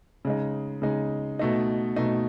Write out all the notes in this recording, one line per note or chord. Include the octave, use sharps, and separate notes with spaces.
C#3 G#3 D#4
C#3 G#3 D#4
B2 A3 D#4
B2 A3 D#4